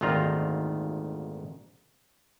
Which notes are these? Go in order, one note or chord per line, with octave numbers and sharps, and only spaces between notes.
G#1 D2 A#2 D#3 F4 A#5